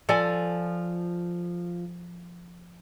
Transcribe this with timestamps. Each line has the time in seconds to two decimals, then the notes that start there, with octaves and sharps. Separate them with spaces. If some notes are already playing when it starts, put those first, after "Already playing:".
0.09 F3 A4 D5 G#5